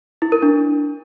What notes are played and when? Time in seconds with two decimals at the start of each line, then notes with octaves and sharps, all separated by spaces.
0.22 E4
0.32 A#4
0.42 D4